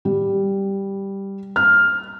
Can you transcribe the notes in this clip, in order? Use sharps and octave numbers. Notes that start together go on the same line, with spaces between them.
G3
F6